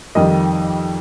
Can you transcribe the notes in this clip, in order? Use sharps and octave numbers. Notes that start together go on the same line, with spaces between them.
F2 D#3 G3 D#5